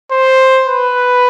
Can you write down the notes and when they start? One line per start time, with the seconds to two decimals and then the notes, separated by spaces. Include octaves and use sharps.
0.11 C5
0.67 B4